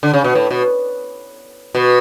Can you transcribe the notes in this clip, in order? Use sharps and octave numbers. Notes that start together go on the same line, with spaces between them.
D3
C#3
B2
A2
B2
B2